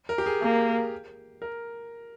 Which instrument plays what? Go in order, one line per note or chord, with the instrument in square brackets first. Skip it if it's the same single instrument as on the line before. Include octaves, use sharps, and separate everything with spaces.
[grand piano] A#4
G4
G#4
[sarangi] A#3 [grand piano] G#4
[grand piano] A#4